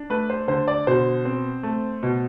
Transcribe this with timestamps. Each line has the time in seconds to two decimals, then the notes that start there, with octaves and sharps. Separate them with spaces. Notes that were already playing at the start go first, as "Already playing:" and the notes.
Already playing: D4
0.10 A3 B4
0.30 C5
0.48 D3 C5
0.68 D5
0.87 B2 C5
1.25 C4
1.63 A3
2.03 B2